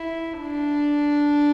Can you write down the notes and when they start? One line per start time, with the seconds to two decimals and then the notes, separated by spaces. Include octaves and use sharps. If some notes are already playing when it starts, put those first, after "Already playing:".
Already playing: E4
0.40 D4